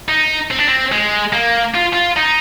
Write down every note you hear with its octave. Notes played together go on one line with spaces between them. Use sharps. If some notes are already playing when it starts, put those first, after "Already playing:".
D#4
C4
D4
C4
G#3
A#3
F4
F4
D#4